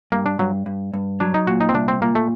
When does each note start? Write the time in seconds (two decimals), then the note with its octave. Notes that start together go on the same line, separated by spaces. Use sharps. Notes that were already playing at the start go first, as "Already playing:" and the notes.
0.12 G2 A#3
0.26 D4
0.39 G2 F#3
0.66 G2
0.93 G2
1.20 F#3 D4
1.34 D#4
1.47 A#2 F#4
1.61 D#4
1.69 C4
1.74 C2 D4
1.88 C4
2.02 A#2 A#3
2.15 A3